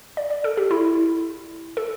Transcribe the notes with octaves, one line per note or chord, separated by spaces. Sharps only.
D5
D5
A4
G4
E4
A4